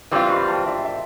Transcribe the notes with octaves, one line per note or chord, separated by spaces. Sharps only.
E3 G3 C4 F4 C6 D6
B5 C#6
G5 A5
D5 E5
D5 E5